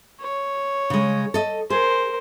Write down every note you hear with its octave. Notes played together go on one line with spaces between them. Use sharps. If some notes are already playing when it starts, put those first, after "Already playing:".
C#5
C#3 G#3
A4 D#5
G#4 A#4 C5